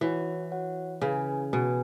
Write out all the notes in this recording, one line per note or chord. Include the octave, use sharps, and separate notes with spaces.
E3 F#4 C#5 F#5
F#4 C#5 F#5
C#3 E4 B4 G#5
B2 G#4 B4 G#5